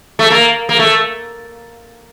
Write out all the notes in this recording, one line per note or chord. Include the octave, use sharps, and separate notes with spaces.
A3
A#3
A#3
A3